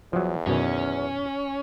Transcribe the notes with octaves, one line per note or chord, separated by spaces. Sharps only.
E2 F3 F#3
F#2 B2 D#3 C#4